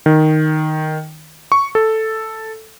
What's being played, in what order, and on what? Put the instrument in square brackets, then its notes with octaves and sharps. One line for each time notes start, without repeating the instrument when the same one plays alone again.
[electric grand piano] D#3
C#6
A4